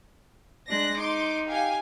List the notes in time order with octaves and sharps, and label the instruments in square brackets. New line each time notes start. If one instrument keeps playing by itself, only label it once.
[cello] G#3 D4 [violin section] F#6 A#6
[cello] D#4 [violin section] C6 D6
[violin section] G4 F5 G#5